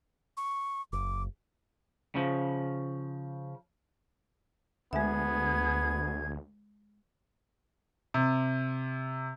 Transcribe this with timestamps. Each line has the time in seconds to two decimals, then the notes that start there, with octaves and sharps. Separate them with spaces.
0.37 C#6
0.93 F#1 D6
2.15 C#3 F3
4.93 D2 G#3 B3 G#4 E5 G#6
8.14 C3